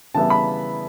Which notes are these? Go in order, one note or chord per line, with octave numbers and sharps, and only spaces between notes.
C#3 E3 G3 B3 E4 A5
B5